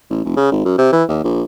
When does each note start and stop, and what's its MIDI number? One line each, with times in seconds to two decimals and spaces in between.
0.10 0.24 33
0.24 0.34 29
0.36 0.51 49
0.52 0.62 32
0.65 0.78 42
0.78 0.89 48
0.92 1.04 52
1.08 1.19 39
1.24 1.42 34